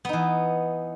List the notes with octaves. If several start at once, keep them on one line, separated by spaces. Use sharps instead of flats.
E3 B3 D#4